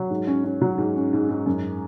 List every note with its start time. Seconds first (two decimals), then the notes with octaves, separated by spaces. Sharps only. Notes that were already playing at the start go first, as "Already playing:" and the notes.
Already playing: F#3
0.10 G#2
0.27 C#4
0.44 C#4
0.62 F#3
0.78 G#2
0.96 C#4
1.13 G#2
1.29 G#2
1.46 F#2